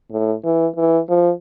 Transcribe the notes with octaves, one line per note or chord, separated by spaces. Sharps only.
A2
E3
E3
F3